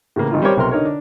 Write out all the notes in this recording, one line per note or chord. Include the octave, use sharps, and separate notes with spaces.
A2 C#3 E3 A#3
G#1 D#4 F4
G3 C4 G4 A#4 C#5 D6
B1 C3 A#4 C6
D3 D#4 A#4 C#5
D4